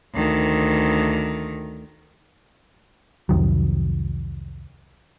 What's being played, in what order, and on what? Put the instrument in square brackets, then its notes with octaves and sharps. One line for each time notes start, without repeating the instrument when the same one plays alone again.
[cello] D2 D#3
[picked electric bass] C2 F2 D#3 F#3